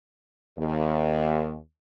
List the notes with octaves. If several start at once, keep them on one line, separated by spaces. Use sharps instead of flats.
D#2